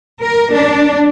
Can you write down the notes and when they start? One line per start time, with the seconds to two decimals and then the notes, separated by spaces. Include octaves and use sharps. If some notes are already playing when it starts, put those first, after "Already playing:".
0.22 A#4
0.54 D4